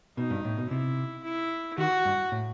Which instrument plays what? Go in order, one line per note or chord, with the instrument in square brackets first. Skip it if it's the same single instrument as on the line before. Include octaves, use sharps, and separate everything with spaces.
[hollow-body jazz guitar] B2 [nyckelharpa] D#4
[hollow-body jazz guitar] G2
A2
B2
[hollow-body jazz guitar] C3 [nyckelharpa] E4
[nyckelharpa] E4
[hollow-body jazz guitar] D#3 [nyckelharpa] F#4
[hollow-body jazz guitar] G2
A2